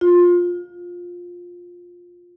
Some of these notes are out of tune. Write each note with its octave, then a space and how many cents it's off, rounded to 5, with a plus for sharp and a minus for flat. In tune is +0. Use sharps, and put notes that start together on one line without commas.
F4 +15